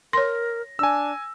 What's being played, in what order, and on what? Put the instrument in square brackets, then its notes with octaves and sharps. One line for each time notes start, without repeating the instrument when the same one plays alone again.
[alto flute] A#4 [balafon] C#5 C6 [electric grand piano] A#6
[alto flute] D4 [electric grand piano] G#5 E6